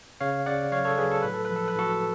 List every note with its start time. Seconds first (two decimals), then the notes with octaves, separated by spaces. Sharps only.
0.21 C#3 C#5 F5
0.46 C#3 D5 F#5
0.72 F#3 C#5 F5
0.85 A4 C#5
0.98 F#3 G#4 B4
1.11 A4
1.22 A2 B4
1.34 A4
1.45 F3 B4
1.56 A4
1.68 B4
1.76 A2 F#4 A4